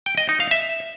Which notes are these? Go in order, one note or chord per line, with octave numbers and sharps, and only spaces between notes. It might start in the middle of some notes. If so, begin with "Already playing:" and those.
G5
D#5
D#4
F5
E5